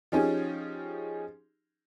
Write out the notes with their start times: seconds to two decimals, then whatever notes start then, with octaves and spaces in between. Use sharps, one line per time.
0.12 F3 C#4 D#4 G4 G#4